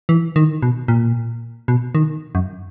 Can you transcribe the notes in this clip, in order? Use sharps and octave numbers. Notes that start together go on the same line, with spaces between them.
E3
D#3
B2
A#2
B2
D#3
F#2